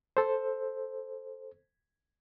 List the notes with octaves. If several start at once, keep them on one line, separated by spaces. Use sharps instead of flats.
A4 C5